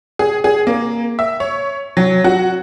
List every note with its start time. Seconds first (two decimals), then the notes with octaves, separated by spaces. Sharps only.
0.19 G#4
0.44 G#4
0.67 A#3
1.19 E5
1.40 C#5
1.97 F#3
2.24 F#4